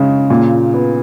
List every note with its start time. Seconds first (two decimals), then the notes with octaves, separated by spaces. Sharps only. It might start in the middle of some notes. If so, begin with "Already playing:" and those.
Already playing: C#3 G#3
0.30 A#2
0.74 B3